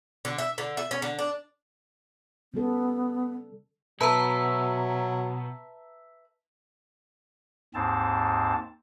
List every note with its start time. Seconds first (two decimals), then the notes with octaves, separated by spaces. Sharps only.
0.25 D3
0.38 E5
0.58 D3
0.77 E5
0.91 C#4
1.02 D3
1.19 D4
2.54 C#3 G3 B3 A4
4.01 B2 F#3 B4 E5 A5 A#5
7.74 D#2 G#2 C4 A5